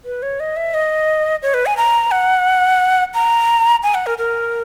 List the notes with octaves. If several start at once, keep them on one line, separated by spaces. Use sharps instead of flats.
B4
C#5
D#5
E5
D#5
C#5
B4
G#5
A#5
F#5
A#5
G#5
F#5
A#4
A#4